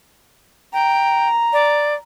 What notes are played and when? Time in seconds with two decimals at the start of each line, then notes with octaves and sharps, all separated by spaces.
0.73 G5 A#5
1.53 D5